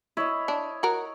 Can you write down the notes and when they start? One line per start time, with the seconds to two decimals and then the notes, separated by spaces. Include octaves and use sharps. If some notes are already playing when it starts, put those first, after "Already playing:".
0.17 E4 C#5 D#5
0.48 D4
0.83 F#4 A#4